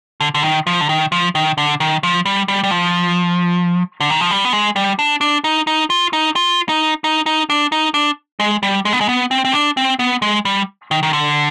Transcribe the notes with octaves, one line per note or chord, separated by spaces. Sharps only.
D3
D3
D#3
F3
D3
D#3
F3
D#3
D3
D#3
F3
G3
G3
G3
F3
D3
D#3
F3
G3
B3
G#3
G3
D4
D4
D#4
D#4
F4
D#4
F4
D#4
D#4
D#4
D4
D#4
D4
G#3
G3
G#3
B3
G#3
B3
C4
C4
D4
C4
B3
G#3
G3
D#3
D#3
D3